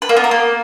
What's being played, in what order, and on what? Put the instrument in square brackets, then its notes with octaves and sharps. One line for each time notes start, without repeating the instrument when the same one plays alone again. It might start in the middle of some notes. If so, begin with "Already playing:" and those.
[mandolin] B4
A#3
B3
A#4
A#3